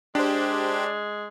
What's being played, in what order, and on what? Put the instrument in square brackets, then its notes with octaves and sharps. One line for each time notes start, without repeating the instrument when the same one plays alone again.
[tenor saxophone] G#3 [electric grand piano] D4 [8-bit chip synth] G4 C5